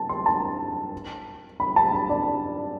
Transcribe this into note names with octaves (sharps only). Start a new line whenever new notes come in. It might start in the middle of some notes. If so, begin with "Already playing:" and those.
Already playing: A5
C6
A5
B5
A5
B5
D5